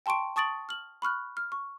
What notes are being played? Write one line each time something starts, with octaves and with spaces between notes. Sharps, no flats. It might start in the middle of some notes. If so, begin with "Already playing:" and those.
G5 A5 C6 C#6 D7
A5 C#6 D#6 A6 D7 F#7
F6 F#7
B5 C#6 F6 F#6
F6
C#6